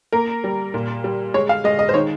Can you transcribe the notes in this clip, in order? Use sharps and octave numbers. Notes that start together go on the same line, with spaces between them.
A#3 A#4
G3
A#2
G3
G#3 C#5
F5
G#3 D#5
D#5
C5
D#3 C#5